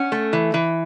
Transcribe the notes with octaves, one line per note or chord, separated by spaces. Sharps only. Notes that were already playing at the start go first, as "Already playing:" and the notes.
Already playing: C#4 F#5
A3
E3
E3